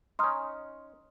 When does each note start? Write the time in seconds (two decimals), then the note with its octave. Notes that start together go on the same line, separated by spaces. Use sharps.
0.19 C#4 D#4 C6 D#6 F6